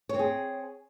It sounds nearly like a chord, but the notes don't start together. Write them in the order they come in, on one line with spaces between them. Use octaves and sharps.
C#5 C4 G#4